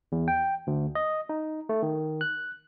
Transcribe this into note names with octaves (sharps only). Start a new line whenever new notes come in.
E2
G5
D2
D#5
D#4
A3
D#3
F#6